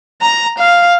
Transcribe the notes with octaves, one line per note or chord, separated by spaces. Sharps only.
A#5
F5